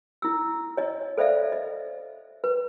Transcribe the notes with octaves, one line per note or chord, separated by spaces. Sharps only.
E4 E6
C#5 D#5
A4 C5 D5 E5 F5
D#5
B4